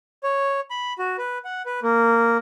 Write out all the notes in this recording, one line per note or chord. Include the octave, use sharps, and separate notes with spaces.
C#5
B5
F#4
B4
F#5
B4
A#3